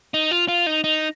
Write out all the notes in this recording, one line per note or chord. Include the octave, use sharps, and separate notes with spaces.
D#4
F4
F4
D#4
D#4